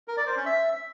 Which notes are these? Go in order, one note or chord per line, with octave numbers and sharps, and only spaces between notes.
A#4
D5
C5
C#4
E5